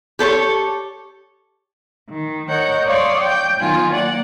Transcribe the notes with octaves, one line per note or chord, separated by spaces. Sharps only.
G4 A4 C5 C#5
D#3
A#4 C#5 D#5 F#5 G6
C#5 D5 F5 C6 D#6
G5 G6
D#3 F#3 B3 F4 G#5
A#3 D5 F#5